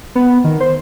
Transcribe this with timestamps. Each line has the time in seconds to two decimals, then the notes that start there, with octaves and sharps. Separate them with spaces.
0.15 B3
0.44 D#3
0.60 C5